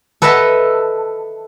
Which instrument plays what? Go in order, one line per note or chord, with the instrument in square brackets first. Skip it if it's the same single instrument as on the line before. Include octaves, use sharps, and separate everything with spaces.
[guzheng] A4 B4 D#5 E5 A5